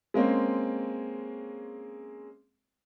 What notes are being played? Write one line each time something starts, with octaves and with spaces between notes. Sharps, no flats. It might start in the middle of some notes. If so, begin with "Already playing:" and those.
G#3 A#3 C4 C#4